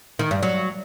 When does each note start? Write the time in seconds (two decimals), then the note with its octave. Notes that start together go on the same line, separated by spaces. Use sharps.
0.19 D#3
0.31 G2
0.43 F#3